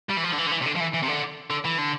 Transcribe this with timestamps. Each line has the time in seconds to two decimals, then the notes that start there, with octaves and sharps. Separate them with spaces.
0.09 G3
0.17 E3
0.23 F3
0.32 D3
0.38 E3
0.46 D3
0.51 E3
0.61 C3
0.65 D3
0.76 F3
0.80 E3
0.94 E3
1.03 C3
1.08 D3
1.50 D3
1.65 E3
1.78 D3